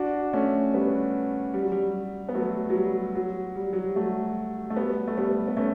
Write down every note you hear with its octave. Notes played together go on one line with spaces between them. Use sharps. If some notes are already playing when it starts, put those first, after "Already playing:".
Already playing: D4 F#4
A3 C#4
G3 B3
G3
F#3
G3
B3
F#3 A3
F#3
G3
F#3
G3
F#3
G3
F#3 A3
A3
G3 B3
A3
G3 B3
B3
A3 C#4